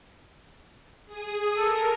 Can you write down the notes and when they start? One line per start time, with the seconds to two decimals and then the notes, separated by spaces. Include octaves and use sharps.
1.06 G#4 D#6
1.57 A4 A#4